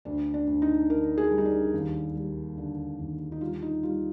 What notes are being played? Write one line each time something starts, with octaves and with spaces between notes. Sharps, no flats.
D2 D4
D4
D2
D#4
D3 A#4
G#4
G3
D#4
D4
D#2
G3
D3
D#2
D#4
G3 F4
D#4
G3 F4